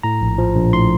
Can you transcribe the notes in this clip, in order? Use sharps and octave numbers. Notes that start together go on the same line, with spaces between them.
A2 A#5
A#1
F3
A#1
A2 C6